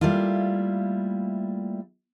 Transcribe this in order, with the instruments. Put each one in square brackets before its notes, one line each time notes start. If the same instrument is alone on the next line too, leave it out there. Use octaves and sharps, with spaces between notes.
[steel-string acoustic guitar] G3 A3 A#3 E4 F4